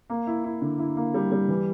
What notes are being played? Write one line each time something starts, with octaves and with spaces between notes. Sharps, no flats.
A#3
E4
E4
D3
E4
A#3
G3
G3
E3